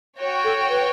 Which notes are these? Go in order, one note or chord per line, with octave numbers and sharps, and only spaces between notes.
F#4 C#5 G5
A4
B4